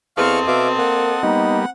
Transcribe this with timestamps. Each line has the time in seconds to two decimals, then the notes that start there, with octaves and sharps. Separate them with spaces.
0.17 E2 C4 A4 D#5 F5 C#6 F6
0.47 B2 E5 F5 D6
0.78 A#3 F#5
1.23 G3 A#3 B3 D#4